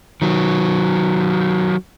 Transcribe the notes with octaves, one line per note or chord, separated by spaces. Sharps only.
D#3 F#3